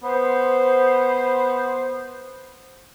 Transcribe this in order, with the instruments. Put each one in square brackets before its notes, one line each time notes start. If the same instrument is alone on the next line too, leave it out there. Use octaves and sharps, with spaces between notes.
[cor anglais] B3 [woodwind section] C5